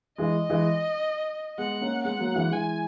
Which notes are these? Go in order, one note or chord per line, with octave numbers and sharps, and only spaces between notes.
E3 G#3 D#5
E3 G#3
G#3 B3 F#5
A#3 C#4
G#3 B3 F#5
F#3 A#3
E3 G#3
E3 G#3 G#5